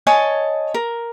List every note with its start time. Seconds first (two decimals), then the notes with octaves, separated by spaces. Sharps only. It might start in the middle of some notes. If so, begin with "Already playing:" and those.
0.07 C#5 D#5 G#5 A5
0.74 A#4